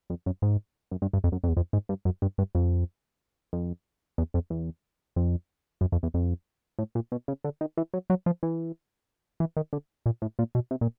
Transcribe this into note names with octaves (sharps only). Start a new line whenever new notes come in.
F2
F#2
G#2
F#2
G2
G2
F2
F#2
F2
E2
F2
G#2
G2
F#2
G2
G2
F2
F2
E2
F2
E2
F2
F#2
F2
E2
F2
A2
A#2
B2
C#3
D3
D#3
E3
F#3
F#3
F3
E3
E3
D#3
D3
A#2
A2
A#2
B2
C3
A#2